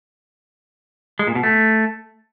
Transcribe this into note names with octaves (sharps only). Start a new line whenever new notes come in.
G#3
A#2
B2
A3